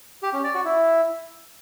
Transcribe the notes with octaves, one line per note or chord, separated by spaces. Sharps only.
G4
C#4
D5
F#4
E4